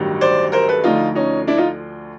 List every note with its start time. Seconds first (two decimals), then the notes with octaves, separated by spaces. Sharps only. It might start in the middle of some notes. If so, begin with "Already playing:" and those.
Already playing: A1 G2 D#3 F#3
0.21 C5 D5
0.52 A#4 C5
0.68 A4 B4
0.84 D2 D3 F3 D#4 F4
1.15 C#4 D#4
1.48 D4 E4
1.57 D#4 F4